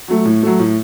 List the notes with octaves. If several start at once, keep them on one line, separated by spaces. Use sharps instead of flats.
F#3 A3
A2
F#3 A3
A2